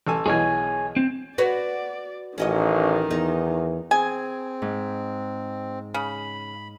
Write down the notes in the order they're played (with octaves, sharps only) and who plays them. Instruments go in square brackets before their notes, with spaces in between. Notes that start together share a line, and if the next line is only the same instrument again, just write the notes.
[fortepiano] A1 A4 G#5
[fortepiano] B1 B2 E3 [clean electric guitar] G#4 C#5 G#5
[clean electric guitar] C4
[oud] F#4 B4 C#5 [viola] D5
[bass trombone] A1 [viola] D#3 [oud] C#4 F#4 D#5
[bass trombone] E2 [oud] D#4
[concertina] C4 [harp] G#4 [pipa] G#5
[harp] G#2
[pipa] C#3 [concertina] B5